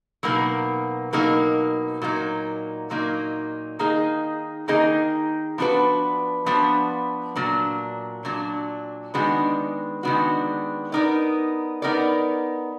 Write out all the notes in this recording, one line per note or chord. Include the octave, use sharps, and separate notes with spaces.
B2 F#3 A#3 D#4 A#4
B2 F#3 A#3 D#4 A#4
A#2 F#3 A#3 D#4
A#2 F#3 A#3 D#4
D#3 A#3 D#4 G#4 D#5
D#3 A#3 D#4 G#4 D#5
F3 B3 D4 F#4 B4
F3 B3 D4 F#4 B4
A#2 F#3 D4
A#2 F#3 D4
D#3 G#3 B3 D4 F#4
D#3 G#3 B3 D4 F#4
B3 D#4 A#4 D5
B3 D#4 A#4 D5